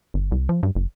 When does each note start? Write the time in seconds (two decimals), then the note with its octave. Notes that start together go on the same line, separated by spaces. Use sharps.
0.14 G1
0.31 C2
0.49 F3
0.63 G2
0.75 F#1